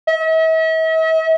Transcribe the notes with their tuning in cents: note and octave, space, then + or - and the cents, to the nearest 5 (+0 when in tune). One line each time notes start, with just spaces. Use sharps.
E5 -45